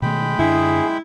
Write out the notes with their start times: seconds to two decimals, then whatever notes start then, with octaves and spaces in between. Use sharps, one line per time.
0.02 B2 D#3 G#3 A3 G5 B5
0.39 F#2 D3 D4 E4 G#4